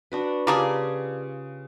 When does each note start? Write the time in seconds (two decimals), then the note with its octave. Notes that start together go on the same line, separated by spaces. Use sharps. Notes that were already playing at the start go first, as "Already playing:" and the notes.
0.12 D4 F#4 B4
0.47 C#3 A#3 D4 F4 G4 G#4